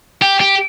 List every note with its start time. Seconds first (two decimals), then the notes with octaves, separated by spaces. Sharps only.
0.22 G4
0.40 G4